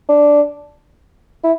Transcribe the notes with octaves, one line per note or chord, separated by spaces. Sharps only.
D4
E4